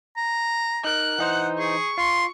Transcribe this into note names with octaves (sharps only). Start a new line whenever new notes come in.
A#5
D#4 A#4 F#6
E3 D#4 C5 F#5
G#4 C#6
F4 C6